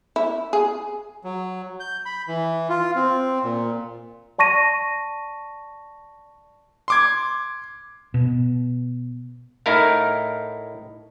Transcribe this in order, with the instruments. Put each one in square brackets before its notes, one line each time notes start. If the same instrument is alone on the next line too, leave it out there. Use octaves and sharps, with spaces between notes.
[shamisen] E4
G#4
[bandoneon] F#3
G6
B5
E3
F4
C4
A#2
[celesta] D5 A5 C#6 A#6 D#7
[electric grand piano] C6 D6 G#6
[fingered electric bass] B2
[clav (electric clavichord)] A2 D#4 E4 A#4 F5